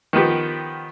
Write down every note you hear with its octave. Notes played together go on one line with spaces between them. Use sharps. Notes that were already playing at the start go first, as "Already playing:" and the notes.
D#3 F3 B3 G4